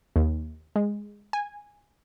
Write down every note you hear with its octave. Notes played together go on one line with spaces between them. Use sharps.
D#2
G#3
G#5